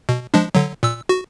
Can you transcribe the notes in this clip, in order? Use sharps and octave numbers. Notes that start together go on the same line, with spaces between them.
B2
F3 G#3 D4
D3 F#3
A#2 E6
F#4